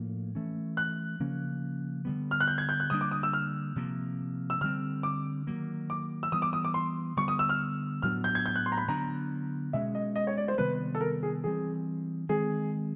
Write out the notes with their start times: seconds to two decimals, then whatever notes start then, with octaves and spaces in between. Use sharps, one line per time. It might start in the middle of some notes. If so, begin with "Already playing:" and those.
Already playing: A2 F3 A#3 D4
0.35 E3 A3 C#4
0.77 F#6
1.20 C#3 F3 A#3 C#4
2.05 D3 G3 B3
2.31 F6
2.40 F#6
2.48 G6
2.58 G#6
2.69 G6
2.80 F#6
2.90 D3 G3 A#3 D4 D#6
3.01 D6
3.11 D#6
3.23 E6
3.33 F6
3.76 C3 F3 A#3
4.50 E6
4.61 D3 G3 C4 F6
5.03 D6
5.47 D#3 F#3 A#3
5.90 D6
6.23 E6
6.32 E3 G3 B3 D#6
6.42 D6
6.53 D#6
6.65 D6
6.74 C6
7.17 D3 G3 B3 C#6
7.28 D#6
7.39 E6
7.49 F6
8.02 A2 F#3 B3 D4 F6
8.24 G6
8.35 G#6
8.46 G6
8.56 F#6
8.66 C6
8.72 A#5
8.77 B5
8.88 D3 F#3 B3 D4 A#5
9.73 B2 G#3 C#4 E5
9.95 D#5
10.16 D#5
10.27 C#5
10.37 D5
10.48 C5
10.58 C3 D#3 G3 B3 B4
10.95 A4
11.01 A#4
11.23 G#4
11.44 E3 G3 C4 G#4
12.29 D#3 G#3 C4 G#4